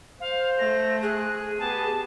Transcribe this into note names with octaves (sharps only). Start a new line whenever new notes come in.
C5 F5
A3 A#6
G#4 F#6
B3 G4 A5